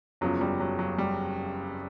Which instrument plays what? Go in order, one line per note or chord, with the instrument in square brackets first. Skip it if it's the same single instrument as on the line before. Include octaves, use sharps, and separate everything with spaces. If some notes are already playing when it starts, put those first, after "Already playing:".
[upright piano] F#1 E2 C#3 F3 F#3
G3
F#3
F#3
G3